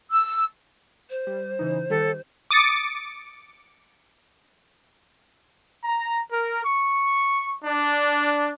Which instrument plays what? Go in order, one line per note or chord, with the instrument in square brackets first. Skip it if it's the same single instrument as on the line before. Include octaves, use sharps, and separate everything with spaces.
[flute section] E6
[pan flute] C5
[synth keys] G3
C#3 E3 D#4
[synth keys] D#3 G3 [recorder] A4
[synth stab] D6 D#6 A6 C#7
[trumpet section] A#5
A#4
C#6
D4